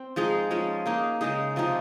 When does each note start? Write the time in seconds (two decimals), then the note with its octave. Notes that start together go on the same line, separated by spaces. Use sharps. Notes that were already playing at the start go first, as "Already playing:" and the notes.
Already playing: C4
0.16 F3 G#3 D#4 G#4
0.51 F3 G#3 C#4
0.86 A#3 D#4 G#4
1.21 C#3 G#3 D#4 G#4
1.56 C3 F3 C4 D#4